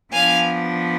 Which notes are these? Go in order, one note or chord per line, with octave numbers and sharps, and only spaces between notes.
F3 B3 D4 F5 G#5